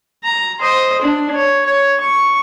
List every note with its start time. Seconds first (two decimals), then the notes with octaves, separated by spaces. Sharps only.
0.24 A#5
0.60 C5 D#5
1.02 D4
1.34 C#5
1.66 C#5
2.01 C#6